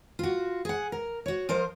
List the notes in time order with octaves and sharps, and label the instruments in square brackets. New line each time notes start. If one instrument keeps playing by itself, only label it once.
[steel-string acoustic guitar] F4 F#4
G#4 F#5
A#4
F#4 C#5
F3 A#4 C5 D#5